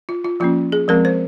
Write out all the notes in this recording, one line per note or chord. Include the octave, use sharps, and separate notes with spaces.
F4
F4
F3 A#3 C#4 F4
G#4
F3 G#3 C4 A#4
C5